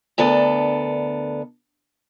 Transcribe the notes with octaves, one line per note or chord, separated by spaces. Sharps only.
D2 B3 D4 A4 A#4